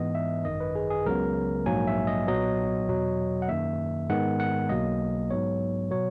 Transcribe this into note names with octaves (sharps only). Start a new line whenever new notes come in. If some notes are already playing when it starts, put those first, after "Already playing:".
Already playing: G#2 E3 B3 D#5
E5
G#1 F#2 D#3 D#5
B4
G#4
G#4
C#2 C#3 F#3 B3 A#4
A#1 G#2 F#3 A#3 G#5
E5
D#5
B1 A#2 F#3 B3 D#5
E2 B2 F#3
F#5
F#2 D#3 A#3 E5
G#2 D#3 G#3 B3 F#5
F#5
B1 B2 F#3 A#3 D#5
G#2 F#3 B3 C#5
B2 F#3 C#5